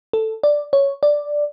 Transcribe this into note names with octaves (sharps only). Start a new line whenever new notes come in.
A4
D5
C#5
D5